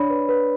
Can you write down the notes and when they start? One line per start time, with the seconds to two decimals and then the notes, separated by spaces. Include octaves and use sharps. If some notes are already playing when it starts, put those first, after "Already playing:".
Already playing: D4 C#5 D5 B5
0.10 B4
0.29 B4